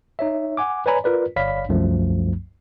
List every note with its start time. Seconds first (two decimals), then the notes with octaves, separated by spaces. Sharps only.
0.19 D#4 C#5 E5
0.57 F#5 G#5 D6
0.86 B4 C#5 D5 G#5 A#5 B5
1.04 F4 A#4 B4 D5
1.36 G1 C#5 D5 F5 B5 B6
1.69 C2 F#2 F3 A3